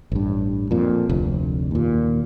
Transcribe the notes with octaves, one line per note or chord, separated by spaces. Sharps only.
A1 G2
F2 A#2
F1 D2
D#2 A#2